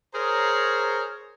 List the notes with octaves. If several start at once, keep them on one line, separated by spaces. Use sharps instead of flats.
G#4 A#4 C5 C#5 A#5